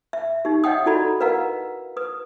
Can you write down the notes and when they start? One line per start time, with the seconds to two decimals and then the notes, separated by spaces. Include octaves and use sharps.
0.13 E5
0.45 D#4 G4
0.64 C#5 D#5 E5 F#5 G5 D#6
0.86 E4 F#4 A4 D5 A#5 B5
1.20 A#4 B4 D#5 F5 F#5 A#5
1.97 B4 D#6